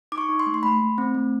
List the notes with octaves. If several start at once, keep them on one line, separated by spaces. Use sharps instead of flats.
D#4 D6
C#6
D#4
C6
A3
C6
A3 B5
A3
C4
A3